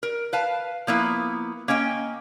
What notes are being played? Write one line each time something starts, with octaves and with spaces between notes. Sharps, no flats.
A#4
B4 F5 A5
F3 A#3 B3 E4
A#3 C#4 D#5 G5